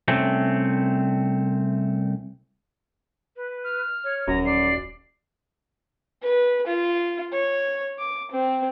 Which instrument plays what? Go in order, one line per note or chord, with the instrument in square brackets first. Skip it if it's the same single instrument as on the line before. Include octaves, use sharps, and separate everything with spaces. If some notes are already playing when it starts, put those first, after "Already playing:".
[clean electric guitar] C2 A3 C4 C#4
[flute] B4
[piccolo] F6
[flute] C#5
[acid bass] D#1 [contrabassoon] F#2 [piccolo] A#5
[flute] D5 [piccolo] C7
[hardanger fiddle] B4
F4
C#5
D6
C4